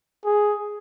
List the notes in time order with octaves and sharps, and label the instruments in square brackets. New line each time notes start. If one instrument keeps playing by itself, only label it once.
[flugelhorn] G#4